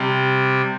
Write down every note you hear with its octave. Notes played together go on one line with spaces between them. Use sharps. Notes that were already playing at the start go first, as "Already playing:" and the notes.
Already playing: C3 G3 C4